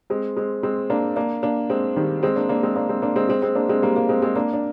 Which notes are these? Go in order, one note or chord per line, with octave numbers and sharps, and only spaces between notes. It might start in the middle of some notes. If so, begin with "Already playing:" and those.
G#3 C4
G#3 C4
G#3 C4
A#3 D4
A#3 D4
A#3 D4
G#3 C4
D#3 G3
G#3 C4
A#3 D4
A#3 D4
G#3 C4
A#3 D4
G#3 C4
A#3 D4
G#3 C4
G#3 C4
G#3 C4
A#3 D4
G#3 C4
G3 A#3
G3 A#3
G#3 C4
G#3 C4
A#3 D4
D4